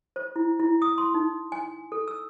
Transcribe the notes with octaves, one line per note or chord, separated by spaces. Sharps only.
C5
E4
E4
D#6
C6
D#4
G#5
A4
E6